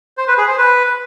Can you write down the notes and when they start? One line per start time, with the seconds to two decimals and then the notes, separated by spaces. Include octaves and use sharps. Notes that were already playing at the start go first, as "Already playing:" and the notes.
0.18 C5
0.28 B4
0.38 G#4
0.48 C5
0.58 B4